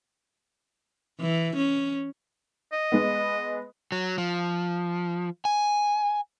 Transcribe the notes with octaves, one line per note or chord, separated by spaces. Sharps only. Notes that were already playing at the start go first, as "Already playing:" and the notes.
E3
C#4
D#5
G#3 B3
F#3
F3
G#5